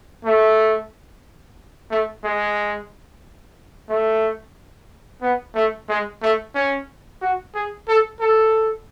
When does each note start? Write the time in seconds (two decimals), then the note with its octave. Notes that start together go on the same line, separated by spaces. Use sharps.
0.25 A3
1.91 A3
2.24 G#3
3.89 A3
5.22 B3
5.55 A3
5.88 G#3
6.22 A3
6.55 C#4
7.21 F#4
7.55 G#4
7.88 A4
8.20 A4